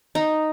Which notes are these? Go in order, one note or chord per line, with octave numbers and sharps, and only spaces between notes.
D#4